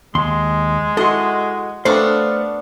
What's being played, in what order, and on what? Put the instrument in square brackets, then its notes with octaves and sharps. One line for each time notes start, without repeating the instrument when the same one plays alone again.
[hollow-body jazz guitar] D#2 C6 [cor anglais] G#3
[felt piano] E4 F#4 [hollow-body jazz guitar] A4 C6 [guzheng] D#5
[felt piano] A3 A4 [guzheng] B3 D4 F#4 [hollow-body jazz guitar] C5 [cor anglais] F5